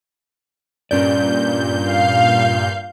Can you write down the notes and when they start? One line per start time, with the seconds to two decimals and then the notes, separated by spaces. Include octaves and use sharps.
0.91 G2 A#2 C#4 D5 G6
1.88 F5